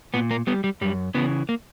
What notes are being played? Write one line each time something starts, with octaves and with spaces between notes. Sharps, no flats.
A#2 B3
A#3
G3 B3
G3
F#2 G3
C#3 E3 B3
A#3